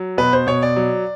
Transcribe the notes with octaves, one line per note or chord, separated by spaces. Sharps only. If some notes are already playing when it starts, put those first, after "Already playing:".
Already playing: F#3
B2 B4
C5
B2 C#5
D5
F#3